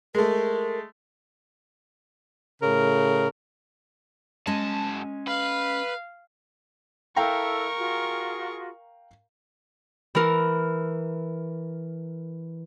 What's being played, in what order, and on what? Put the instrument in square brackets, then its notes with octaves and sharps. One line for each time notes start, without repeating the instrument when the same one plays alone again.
[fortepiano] G#3 A3 [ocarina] A#4
[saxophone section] A2 C#3 A#4
[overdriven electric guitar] F#2 A5 [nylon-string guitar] G#3 C#4 D#5
[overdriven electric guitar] B4 [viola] F5
[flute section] E4 A4 [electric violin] A#4 C#6 [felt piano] F5 G5 A#5
[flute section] F4 F#4 G#4
[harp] E3 A#4